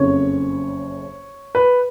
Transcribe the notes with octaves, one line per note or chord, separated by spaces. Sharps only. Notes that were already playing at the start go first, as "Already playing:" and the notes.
Already playing: F#1 F2 C#3 C#5
B4